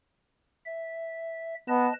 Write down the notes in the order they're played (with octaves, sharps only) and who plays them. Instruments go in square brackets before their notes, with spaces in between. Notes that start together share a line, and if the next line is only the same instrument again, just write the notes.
[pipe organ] E5
[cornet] B3 [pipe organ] B4 D#5 A5